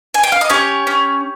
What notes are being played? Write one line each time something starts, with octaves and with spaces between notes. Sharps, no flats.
G#5
G5
F5
D#5
C#4 G4 C#5
C#4